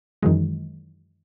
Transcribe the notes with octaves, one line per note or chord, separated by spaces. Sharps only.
F#2 D#3 E3 F#3 G#3